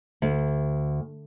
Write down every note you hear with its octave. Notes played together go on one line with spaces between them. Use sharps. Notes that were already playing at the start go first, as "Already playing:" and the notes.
D2